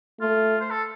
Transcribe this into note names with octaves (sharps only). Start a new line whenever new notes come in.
A3 F4
C5
A4